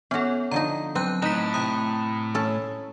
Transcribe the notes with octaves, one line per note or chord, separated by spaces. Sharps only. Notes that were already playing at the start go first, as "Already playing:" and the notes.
B3 C#4 F#4 A4
D3 F3 D#4 A#5
F#3 C4 A#5 F#6
A2 D#4 F#6 B6
C3 A#5 D#6
C#4 A4